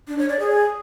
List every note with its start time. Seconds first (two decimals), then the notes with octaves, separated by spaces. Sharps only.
0.08 D4
0.18 C#5
0.29 D5
0.40 G#4